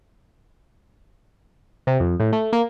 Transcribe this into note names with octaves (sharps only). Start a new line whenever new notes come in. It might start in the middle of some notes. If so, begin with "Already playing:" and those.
C3
F2
A2
A3
A#3